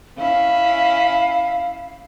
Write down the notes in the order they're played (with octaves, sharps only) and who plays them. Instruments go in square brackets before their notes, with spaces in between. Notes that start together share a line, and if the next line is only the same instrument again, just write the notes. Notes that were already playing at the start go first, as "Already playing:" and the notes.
[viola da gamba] C#4 E4 [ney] F5